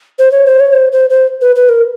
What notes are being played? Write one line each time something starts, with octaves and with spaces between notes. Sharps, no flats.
C5
C#5
C5
C#5
C5
C5
C5
B4
B4
A#4